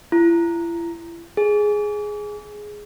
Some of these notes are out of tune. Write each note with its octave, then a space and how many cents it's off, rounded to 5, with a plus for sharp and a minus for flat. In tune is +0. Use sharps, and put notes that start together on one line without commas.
E4 +40
G#4 +5